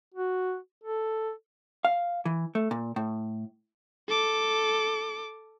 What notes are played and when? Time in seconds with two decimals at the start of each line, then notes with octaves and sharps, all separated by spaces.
0.14 F#4
0.84 A4
1.85 F5
2.25 E3
2.55 A3
2.71 A#2
2.96 A2
4.08 A4 D6